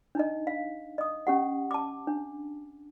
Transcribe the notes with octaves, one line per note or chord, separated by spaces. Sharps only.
D4 D#4 D#5
F5
D#5 D#6
C#4 G4 F#5
A5 D6
D4